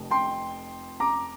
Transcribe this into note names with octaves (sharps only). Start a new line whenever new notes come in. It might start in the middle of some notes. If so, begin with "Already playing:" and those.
Already playing: F1 F2
G5 C6
A#5 D6